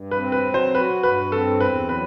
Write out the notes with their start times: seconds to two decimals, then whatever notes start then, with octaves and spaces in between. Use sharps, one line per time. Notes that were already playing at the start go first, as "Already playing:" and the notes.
Already playing: G2
0.11 B4
0.18 C4
0.32 B4
0.47 F#3
0.54 C5
0.75 F#4 B4
1.03 G2 B4
1.32 C4 A4
1.60 E2 B4
1.89 F#3 B4